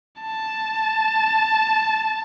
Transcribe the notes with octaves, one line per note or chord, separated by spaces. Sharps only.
A5